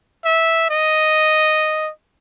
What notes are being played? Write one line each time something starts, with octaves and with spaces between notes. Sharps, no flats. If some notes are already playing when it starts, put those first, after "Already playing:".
E5
D#5